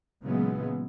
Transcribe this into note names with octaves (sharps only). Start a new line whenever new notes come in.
A#2 C#3 E3 F#3 G#3 B3